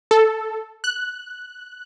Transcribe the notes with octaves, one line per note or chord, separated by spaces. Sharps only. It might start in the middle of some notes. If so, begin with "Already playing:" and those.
A4
F#6